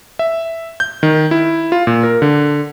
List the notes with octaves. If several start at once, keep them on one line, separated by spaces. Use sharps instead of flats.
E5
G6
D#3
E4
F4
A#2
A#4
D3